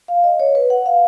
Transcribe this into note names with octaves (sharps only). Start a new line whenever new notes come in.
F5
D#5
C#5
B4
F#5
F5